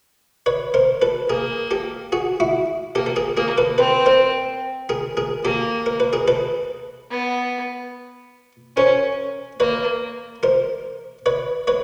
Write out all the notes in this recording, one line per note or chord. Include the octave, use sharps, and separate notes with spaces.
B4 C#5
A#4 C5
A4 B4
A#3 G#4 A#4
G4 A4
F#4 G#4
E4 F#4
A#3 G4 A4
A4
G#4 A#4
A#3 G#4 A#4
A4 B4
C4 A4 B4
A#4 C5
G#4 A#4
G#4 A#4
A#3 G4 A4
A#4
B4
G#4 A#4
A4 B4
B3
C#4 A#4 C5
A#3 B4 C#5
A#4 C5
B4 C#5
B4 C#5